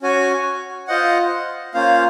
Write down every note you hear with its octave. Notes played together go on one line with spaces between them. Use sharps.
C#4 F#4 C#5 G#5
F4 C5 D#5 F#5
A#3 C#4 F4 C5 F5